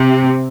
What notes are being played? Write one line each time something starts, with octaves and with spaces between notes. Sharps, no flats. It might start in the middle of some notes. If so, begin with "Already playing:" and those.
Already playing: C3